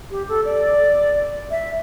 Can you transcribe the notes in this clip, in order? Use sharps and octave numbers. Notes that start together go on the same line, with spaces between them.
G4
A4
D5
E5